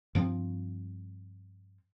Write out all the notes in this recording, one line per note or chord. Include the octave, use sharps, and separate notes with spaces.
G2 F3 C4